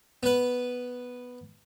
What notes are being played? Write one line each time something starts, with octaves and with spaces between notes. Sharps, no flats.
B3 B4